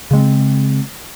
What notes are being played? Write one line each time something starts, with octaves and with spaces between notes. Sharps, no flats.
C#3 G#3 C4